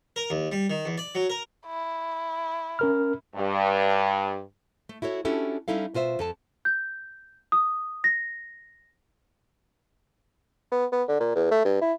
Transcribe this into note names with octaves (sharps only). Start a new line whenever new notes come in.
A#4
D#2
G3
D#3
E2
D5
F#3
A#4
E4
C#4 A#4 F6
G2
A3
E4 F#4 A4 C#5
C#4 D4 E4 F#4 G4 A4
G3 C#4 D#4 E4 A4 F5
B2 F4 C5 E5
F2 A4 A5
G6
D#6
A#6
B3
B3
D3
A#2
E2
A3
G2
E4